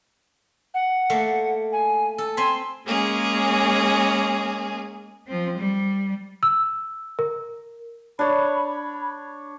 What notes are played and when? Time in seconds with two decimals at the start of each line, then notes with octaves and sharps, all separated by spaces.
0.74 F#5
1.10 A3 A#3
1.72 G#5
2.18 A4
2.37 C4 G#5 B5 C6
2.87 G#3 A#3 C#4 G#4
5.27 F3 C4
5.58 G3
6.43 E6
7.19 A#4
8.19 D4 C#5 B5